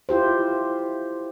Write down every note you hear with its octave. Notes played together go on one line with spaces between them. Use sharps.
E4 F4 G4 C5